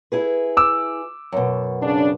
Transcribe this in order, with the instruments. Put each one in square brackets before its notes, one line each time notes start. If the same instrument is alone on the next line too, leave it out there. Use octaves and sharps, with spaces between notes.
[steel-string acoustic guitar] E4 G#4 B4
[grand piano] D6 E6
[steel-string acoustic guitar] F#2 B2
[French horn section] C#3 D4